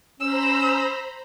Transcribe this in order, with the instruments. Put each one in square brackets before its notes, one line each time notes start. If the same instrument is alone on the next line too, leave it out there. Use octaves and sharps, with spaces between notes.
[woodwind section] C#4 [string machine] C5 A#5 B5 [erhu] E6